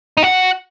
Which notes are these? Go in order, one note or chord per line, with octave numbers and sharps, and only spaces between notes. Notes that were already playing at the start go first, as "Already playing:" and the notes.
D#4
F#4